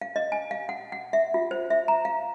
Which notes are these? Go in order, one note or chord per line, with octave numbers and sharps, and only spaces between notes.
F5
D#5
G#5
F5
F#5
F#5
E5
F4
C5
E5
A#5
F5